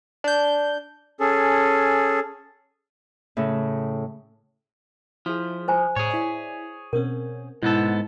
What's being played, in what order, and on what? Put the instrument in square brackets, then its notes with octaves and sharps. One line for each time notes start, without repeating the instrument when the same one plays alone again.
[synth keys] D4 G6
[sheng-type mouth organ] C#4 G#4 A4
[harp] A2 C#3
[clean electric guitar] F3 [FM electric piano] E4 G#4
[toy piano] C5 G#5 A#5
[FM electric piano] A2 [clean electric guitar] G#4 C#5
[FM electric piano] E4 D5
[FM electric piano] B2 C4 C#4 [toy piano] A#4
[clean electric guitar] G#2 B3 A4 [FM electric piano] B2 [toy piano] E4